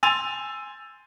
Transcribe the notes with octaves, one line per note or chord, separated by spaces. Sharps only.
G#5 C6 E6 A6 D#7 F7